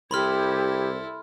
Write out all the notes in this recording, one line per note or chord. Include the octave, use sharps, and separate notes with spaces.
C2 E4 G4 A4 B5 C6 F6 G#6